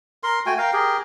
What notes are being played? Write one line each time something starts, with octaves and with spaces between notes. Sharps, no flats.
A#4 C6
A3 F#4 G5 G#5
A#4 F5 G5
G4 G#4 A#4